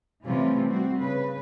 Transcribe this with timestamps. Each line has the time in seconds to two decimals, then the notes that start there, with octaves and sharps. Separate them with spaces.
0.25 C3 E3 G3 A3 C#4 F4
0.68 G3 C4 F#4
0.96 C#3 B4